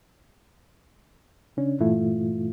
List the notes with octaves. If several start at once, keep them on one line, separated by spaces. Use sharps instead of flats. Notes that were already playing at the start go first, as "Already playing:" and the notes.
C#3 C#4 D4
G2 A#2 E3 A3 E4 F4